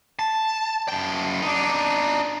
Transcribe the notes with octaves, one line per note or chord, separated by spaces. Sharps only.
A5
F#2 G5
D4 D#4